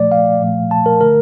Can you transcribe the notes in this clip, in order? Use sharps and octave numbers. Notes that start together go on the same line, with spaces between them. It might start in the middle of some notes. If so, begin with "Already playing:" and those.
Already playing: A#2 F3 A3 D5
F5
A#2 F3 A3
A5
A#4
D3 A3 A#4